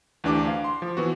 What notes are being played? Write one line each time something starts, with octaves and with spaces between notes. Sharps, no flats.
D2 E3 D4 G4 D6
F5
C6
F3
E3 B3 F#4